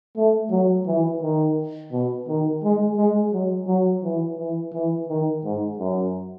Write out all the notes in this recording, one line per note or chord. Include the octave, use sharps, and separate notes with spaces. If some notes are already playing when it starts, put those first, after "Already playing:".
A3
F#3
E3
D#3
B2
D#3
G#3
G#3
F#3
F#3
E3
E3
E3
D#3
G#2
F#2